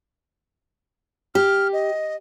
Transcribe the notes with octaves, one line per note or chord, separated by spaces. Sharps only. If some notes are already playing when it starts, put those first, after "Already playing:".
G4 F6
D#5